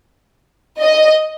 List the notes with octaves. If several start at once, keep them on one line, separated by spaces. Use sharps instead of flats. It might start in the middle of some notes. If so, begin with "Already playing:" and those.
D#5